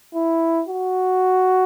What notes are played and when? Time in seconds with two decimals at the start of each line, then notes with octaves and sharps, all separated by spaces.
0.14 E4
0.68 F#4